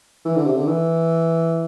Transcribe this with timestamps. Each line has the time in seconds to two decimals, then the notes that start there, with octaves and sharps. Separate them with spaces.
0.25 E3
0.36 D3
0.46 C3
0.57 D3
0.67 E3